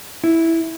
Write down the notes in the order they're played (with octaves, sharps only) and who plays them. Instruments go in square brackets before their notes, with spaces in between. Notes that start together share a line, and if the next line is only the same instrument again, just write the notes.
[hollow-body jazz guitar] E4